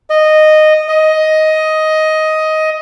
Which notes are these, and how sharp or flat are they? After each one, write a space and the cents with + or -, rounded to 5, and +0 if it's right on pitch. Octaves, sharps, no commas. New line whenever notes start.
D#5 -10
D#5 +10